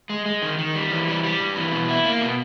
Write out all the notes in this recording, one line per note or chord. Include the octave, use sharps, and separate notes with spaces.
G#3
G#3
D#3
D#3
G3
E3
G3
G3
G2
E3
B2
E4
A#3
B2